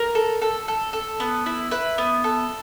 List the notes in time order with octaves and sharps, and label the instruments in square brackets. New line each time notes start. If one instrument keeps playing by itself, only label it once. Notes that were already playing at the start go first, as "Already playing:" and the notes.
Already playing: [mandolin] A#4
A4
A4
A4
A4
B3
E4
E4 B4
B3
A4